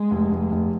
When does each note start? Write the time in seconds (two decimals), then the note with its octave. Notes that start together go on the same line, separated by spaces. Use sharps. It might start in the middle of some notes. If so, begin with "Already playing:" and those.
Already playing: G#3
0.11 F1
0.32 F1
0.52 F1